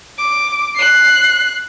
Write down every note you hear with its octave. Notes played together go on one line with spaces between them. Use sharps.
D6
F#6 C7